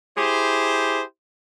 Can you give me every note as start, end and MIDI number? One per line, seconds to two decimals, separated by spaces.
0.17 1.02 64
0.17 1.02 67
0.17 1.02 68
0.17 1.02 72